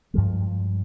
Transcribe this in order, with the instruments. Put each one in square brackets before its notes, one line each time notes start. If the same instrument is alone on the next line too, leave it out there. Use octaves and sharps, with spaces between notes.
[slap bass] G2 F3 G#3